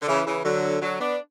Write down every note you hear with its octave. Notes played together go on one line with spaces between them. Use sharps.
D3
C#3 E3
C#3 E3
D3 F#3
D3 F#3
B3 D4